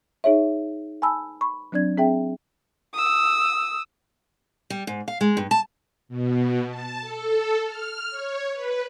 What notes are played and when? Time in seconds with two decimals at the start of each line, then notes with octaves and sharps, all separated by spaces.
0.24 D#4 G#4 C#5 E5
1.02 G#5 A5 B5 E6
1.41 B5 C#6
1.72 F#3 C4 D4 D5 G#6
1.98 C4 G#4 E5 G5
2.93 D#6 E6
4.70 G3
4.87 G#2
5.08 F5
5.21 G#3
5.37 G2
5.51 A5
6.08 B2
6.68 A5
7.01 A4
7.65 F6
8.11 C#5
8.53 B4